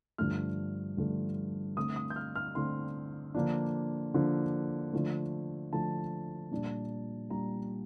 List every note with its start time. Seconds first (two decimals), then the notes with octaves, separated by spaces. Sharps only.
0.18 G2 D3 F3 A3 F6
0.97 G2 D3 F3 A3
1.77 D3 A3 C4 D#6
1.96 D#6
2.10 G6
2.16 F6
2.36 F6
2.55 D3 A3 C4 C6
3.35 D3 F3 A#3 D4
4.14 D3 F3 A#3 D4
4.93 D3 F3 A3
5.73 D3 F3 A3 A5
6.51 A#2 G3 D4
7.30 A#2 G3 D4 A#5